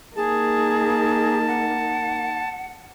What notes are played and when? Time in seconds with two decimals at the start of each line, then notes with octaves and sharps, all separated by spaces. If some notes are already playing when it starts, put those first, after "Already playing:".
0.16 A#3 D#4 G#4 A5
1.48 F#5